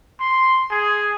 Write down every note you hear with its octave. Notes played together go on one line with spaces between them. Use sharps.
C6
G#4